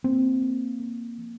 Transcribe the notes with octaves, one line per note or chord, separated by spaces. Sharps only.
A#3 C4
A#3
A#3
F3